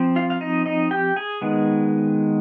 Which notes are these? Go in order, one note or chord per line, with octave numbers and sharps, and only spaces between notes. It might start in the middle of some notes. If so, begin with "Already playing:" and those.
Already playing: F3 C4
F4 F5
F5
D#4 D#5
D#4 D#5
G4 G5
G#4 G#5
D#3 G#3 B3